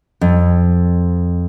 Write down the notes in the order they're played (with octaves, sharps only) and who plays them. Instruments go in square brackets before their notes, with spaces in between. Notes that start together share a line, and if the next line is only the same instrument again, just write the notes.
[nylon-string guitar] F2